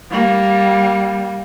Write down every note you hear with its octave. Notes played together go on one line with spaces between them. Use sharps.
G3 A#3